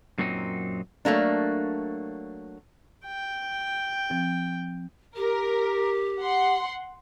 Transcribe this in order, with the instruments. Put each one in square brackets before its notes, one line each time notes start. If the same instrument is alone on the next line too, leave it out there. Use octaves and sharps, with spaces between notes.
[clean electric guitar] F#2 A#2 F#3 C4 D#4
[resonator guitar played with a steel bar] F#3 A3 A#3 D4
[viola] G5
[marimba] F3 C4
[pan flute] G4 [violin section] A#4
[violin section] F#5 C6